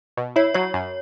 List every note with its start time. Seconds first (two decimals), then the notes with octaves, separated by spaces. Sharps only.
0.17 B2
0.36 E4 C#5
0.54 F#3 C#5
0.74 F#2